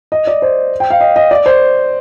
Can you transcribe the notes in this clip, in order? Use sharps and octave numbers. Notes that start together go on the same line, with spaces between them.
D#5
D5
C5
G5
F5
D#5
D#5
D5
C5